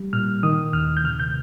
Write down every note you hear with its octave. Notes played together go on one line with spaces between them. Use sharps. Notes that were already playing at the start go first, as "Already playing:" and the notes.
Already playing: G3
A#2 F6
D#3 D#6
D#2 F6
G6
C3 F6
G6